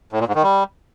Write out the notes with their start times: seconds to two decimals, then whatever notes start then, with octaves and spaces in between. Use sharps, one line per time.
0.13 A2
0.20 A#2
0.28 G#2
0.35 D#3
0.43 G3